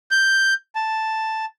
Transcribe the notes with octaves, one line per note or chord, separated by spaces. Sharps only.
G6
A5